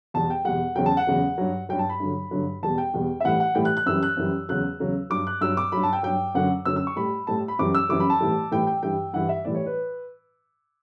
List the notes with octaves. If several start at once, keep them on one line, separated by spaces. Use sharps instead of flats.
E2 B2 G3 A5
G5
E2 B2 G3 F#5
E2 C#3 F#3 G5
A5
F#5
E2 C#3 F#3
G2 F#3
G2 F#3 G5
A5
B5
G2 D3 F#3
G2 D3 F#3
E2 B2 G3 A5
G5
E2 B2 G3
E5
A2 E3 G3 F#5
F#5
A2 E3 G3 G5
F#6
F#6
F#2 E3 G3 E6
F#6
F#2 E3 G3
E2 C#3 F#3 F#6
E2 C#3 F#3
G2 F#3 D6
F#6
G2 F#3 E6
D6
G2 F#3 B5
A5
G5
G2 F#3 G5
F#2 D3 F#3 F#5
F#2 D3 F#3 E6
E6
C#6
A2 G3 B5
A2 G3 A5
B5
F#2 E3 G3 D6
E6
F#2 E3 G3 D6
B5
A5
A2 E3 G3
A2 E3 G3 G5
G5
G2 E3 G3 G5
G2 E3 G3 F#5
E5
A2 E3 G3 D5
C#5
B4